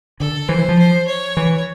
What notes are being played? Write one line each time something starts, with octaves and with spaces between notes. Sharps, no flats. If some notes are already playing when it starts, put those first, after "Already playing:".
D3 A4
E3 C5
E3
F3
C5
C#5
E3